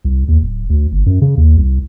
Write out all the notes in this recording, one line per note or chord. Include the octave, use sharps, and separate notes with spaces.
C2
D#2
D1
D2
G1
F#2
C#3
D#2
C2